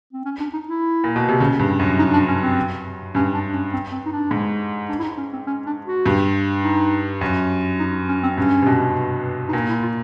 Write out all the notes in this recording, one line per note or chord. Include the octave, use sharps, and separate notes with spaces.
C4
C#4
D4
D#4
E4
A#2
B2
C3
C#3
G2
F#2
D#4
D4
C#4
C4
G2 C#4
D4
C#4
C4
C4
D#4
D4
G#2
D4
E4
D#4
C#4
C4
C#4
D4
F#4
G2
D#4
F#2
D#4
C#4
C4
G2 C#4
C3
B2
D#4
A#2 D4
E4
F4